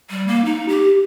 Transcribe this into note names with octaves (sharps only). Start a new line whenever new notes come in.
G3
A#3
D#4
G4